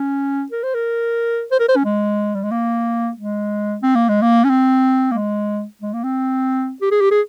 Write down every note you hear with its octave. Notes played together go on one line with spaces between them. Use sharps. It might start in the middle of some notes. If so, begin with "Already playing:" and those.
Already playing: C#4
A#4
C5
A#4
C5
A#4
C5
C#4
G#3
G3
G#3
A#3
G#3
C4
A#3
G#3
A#3
C#4
C4
A#3
G#3
G#3
A#3
C4
G4
G#4
G4
G#4